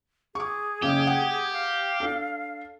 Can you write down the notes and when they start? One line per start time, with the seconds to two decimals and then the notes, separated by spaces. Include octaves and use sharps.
0.35 G#4 C#6 D6
0.82 F#1 C#4 G4 F5
1.07 F#5 G5
1.53 F5
2.00 D4 A4